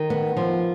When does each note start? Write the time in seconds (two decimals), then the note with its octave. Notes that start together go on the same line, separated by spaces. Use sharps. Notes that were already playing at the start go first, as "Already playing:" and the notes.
Already playing: D#3
0.10 B3
0.37 F3